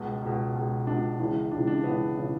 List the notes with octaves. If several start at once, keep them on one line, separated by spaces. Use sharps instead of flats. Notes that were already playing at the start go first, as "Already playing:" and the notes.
Already playing: C#2 B2
C#2 B2
C#2 B2
C#2 B2 D4
C#2 C#3 E3
C#2 C#3 E3 D4
D4
C#2 C#3 E3 B3
C#3 E3